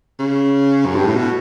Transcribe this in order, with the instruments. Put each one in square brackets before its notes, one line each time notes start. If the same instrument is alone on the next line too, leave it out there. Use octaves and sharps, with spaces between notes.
[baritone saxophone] C#3
F#2
G2
A2
B2